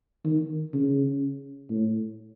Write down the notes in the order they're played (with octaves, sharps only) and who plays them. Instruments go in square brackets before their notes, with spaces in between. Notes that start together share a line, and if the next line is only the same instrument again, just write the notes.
[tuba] D#3
C#3
A2